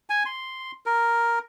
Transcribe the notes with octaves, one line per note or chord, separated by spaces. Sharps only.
G#5
C6
A#4